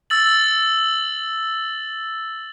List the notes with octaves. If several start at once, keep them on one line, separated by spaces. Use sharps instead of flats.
E6 A6 F#7